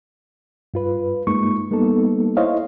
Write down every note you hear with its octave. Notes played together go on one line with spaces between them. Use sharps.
G2 F4 B4
G2 G#3 A#3 D#4 C#6
G3 A#3 B3 D#4 A4
E4 C5 C#5 D#5 F5